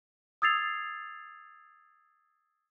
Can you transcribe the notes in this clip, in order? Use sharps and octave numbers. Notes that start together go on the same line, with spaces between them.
D#6 E6 G#6 A6 C7 F7